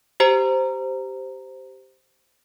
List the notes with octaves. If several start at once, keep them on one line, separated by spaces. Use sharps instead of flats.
G4 C5 A#5